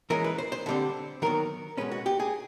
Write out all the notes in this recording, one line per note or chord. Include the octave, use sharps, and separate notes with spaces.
E3 G#3 C#4 A#4
B4
C5
C5
D3 G3 C4
D#3 F#3 B3 A#4
B2 G#3 C#4 B4
F#4
G4
G#4